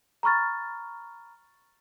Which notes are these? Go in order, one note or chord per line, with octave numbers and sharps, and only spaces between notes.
A#5 B5 C#6 F6 A6